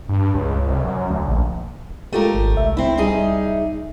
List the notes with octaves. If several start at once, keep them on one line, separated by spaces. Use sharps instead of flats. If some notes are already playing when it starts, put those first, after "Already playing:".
G2
C#2
C2
F#2
D2
A#1
G#3 A3 F4 G4 A#4
G#1
C2 E5
C4 E4
G3 D#4 G#4